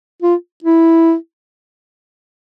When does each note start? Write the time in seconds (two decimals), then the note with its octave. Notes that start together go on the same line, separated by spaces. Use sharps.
0.22 F4
0.64 E4